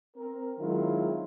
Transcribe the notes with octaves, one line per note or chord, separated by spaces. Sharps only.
C4 A#4
D#3 F#3 G#3 C4 E4 F4